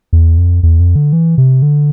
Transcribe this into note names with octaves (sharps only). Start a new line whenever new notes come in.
E2
F2
E2
F2
D3
E3
C3
D3